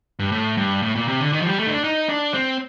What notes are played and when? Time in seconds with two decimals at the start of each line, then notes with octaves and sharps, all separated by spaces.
0.19 G2
0.32 A2
0.57 G2
0.82 A2
0.95 A#2
1.08 C3
1.20 D3
1.33 D#3
1.41 F3
1.46 G3
1.59 A3
1.66 D#4
1.71 D4
1.84 D#4
2.09 D4
2.34 C4